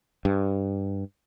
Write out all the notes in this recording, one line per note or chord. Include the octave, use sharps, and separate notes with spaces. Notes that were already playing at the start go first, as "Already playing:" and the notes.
G2